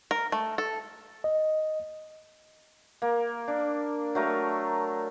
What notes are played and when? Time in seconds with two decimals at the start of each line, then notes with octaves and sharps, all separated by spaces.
0.11 A#4
0.32 A3
0.58 A4
1.24 D#5
3.02 A#3
3.48 D4
4.15 F#3 A3 A#4